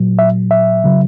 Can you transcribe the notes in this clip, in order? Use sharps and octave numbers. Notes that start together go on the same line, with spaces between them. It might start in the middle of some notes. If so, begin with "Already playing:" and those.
Already playing: A#2 F#3
E5
E5
C#3 F#3